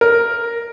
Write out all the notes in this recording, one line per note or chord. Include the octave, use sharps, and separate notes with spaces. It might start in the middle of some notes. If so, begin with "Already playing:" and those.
A#4